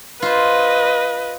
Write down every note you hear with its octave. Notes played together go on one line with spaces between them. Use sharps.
F4 B4 C5 D#5